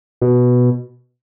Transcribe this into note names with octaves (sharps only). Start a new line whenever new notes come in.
B2